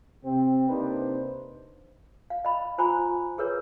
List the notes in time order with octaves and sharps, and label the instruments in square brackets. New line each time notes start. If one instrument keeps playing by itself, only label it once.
[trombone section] C3 C4
C3 A#3 D4 D#4 B4 C5
[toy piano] F5
D#5 B5
F4 C5 G#5 A#5 B5 C#6
G#4 A#4 B4 C#5